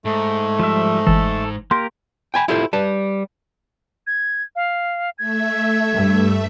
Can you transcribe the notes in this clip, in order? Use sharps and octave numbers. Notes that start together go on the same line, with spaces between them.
G#2 A3
F3 G3 E5
G1 E3 A4
A#3 G4 A#4 C6
G5 G#5 B5
E4 F4 G4 A4 C5
G3 B4 A5
G#6
F5
A3 E5 G#6
G2